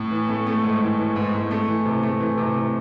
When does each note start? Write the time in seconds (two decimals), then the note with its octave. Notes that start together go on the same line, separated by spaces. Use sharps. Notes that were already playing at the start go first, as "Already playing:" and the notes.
Already playing: A2
0.11 E3
0.29 A3
0.47 A3
0.64 G#2
0.81 E3
0.98 E3
1.16 G#2
1.34 G#2
1.51 A3
1.68 E3
1.86 C3
2.03 A3
2.20 E3
2.38 C3
2.55 C3